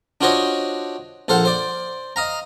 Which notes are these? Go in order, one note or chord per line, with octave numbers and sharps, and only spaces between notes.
D4 F4 F#4 C5 C#5 D#5
A#1 A4 C5 F5 F#5
C5 D5
D#5 F5 A#5